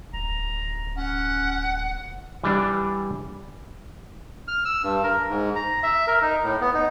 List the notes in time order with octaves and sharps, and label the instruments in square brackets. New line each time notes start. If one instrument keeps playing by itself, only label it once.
[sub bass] D1 [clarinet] A#5
[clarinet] C#4 [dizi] F#5
[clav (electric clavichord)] E3 G3 D4
[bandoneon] F6
E6
G2
A#4
G#2
A#5
E5
A#4
D#4
A2
B3
D#4